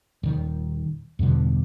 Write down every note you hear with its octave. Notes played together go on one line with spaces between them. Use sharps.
D#1 D#3
E2 G2 B2 D3